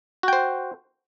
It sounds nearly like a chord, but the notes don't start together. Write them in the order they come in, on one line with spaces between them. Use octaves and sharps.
F#4 G5 C5